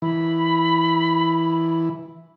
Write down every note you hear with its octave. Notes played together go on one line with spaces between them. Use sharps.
E3 B5